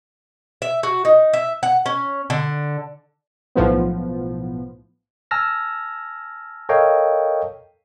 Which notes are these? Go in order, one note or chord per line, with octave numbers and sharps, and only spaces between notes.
E5
F#4
D#4
E5
F#5
C#4
D3
B1 A2 F3 B3
G#5 A5 E6 F6 A#6
A4 A#4 C#5 D#5 F5 G5